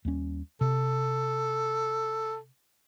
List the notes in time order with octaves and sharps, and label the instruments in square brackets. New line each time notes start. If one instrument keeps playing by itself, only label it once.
[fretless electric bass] D#2 G3 C#4
[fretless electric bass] C3 [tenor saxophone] A4